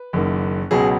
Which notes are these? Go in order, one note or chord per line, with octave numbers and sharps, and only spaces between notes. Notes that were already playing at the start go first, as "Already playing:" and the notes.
Already playing: B4
F#1 F#2 D#3 A#3
C#2 B2 F#3 B3 G#4